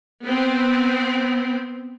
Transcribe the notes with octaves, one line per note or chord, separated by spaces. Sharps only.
B3 C4